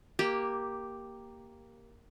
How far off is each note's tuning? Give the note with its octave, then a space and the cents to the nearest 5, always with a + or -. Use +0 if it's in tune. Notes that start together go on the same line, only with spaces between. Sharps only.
A#3 +0 G4 +0